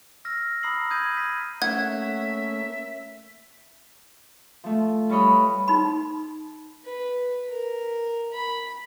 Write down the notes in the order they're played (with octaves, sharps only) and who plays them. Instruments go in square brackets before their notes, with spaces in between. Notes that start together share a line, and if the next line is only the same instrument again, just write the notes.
[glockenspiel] E6 F6 A#6
A#5 B5 D#6 E6 C7 F#7
D#6 G6 G#6 D#7
B6
[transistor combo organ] A3 A#3 C#4 [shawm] E5 [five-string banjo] F#5 [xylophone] G#6
[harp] F3 A3
G3 B4 C#5 D#5 B5
[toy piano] D#4 B5
[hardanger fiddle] B4
A#4
B5